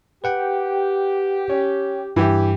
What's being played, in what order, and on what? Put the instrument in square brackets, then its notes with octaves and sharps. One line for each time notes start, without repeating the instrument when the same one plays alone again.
[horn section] G4 [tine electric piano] B4 F#5 G5
[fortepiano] C#4
[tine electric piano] G2 [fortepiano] E3 G4